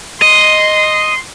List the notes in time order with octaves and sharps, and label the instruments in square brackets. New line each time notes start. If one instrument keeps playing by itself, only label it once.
[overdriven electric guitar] D#5 [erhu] C6